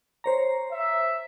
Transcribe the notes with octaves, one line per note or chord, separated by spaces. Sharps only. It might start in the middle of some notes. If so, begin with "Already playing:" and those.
C5 C#5 A#5
E5